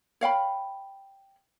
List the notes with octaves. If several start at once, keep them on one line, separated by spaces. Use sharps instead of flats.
C#5 F5 G5 B5